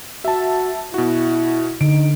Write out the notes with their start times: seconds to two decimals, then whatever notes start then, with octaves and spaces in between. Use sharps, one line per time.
0.25 F#4 E5 A5
0.94 B2 E4 F#4
1.81 D3 D#4 D7